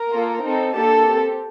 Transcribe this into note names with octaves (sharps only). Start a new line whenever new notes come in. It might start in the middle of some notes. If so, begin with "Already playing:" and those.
Already playing: A#4
A#3 F4 A4
C4 D#4 A4
A#3 D4 G4 A4 A5
C4 G4